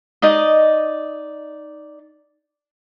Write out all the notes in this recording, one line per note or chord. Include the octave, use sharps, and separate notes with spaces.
D#4 D5 D#5